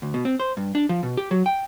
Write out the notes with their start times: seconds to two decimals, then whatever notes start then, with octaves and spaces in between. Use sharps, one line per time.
0.02 D2
0.14 B2
0.25 C4
0.40 C5
0.57 G2
0.75 D4
0.89 F3
1.03 B2
1.17 G4
1.31 F#3
1.46 G5